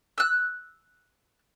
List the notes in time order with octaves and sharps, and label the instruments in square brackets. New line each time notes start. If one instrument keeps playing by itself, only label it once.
[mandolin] E6 F#6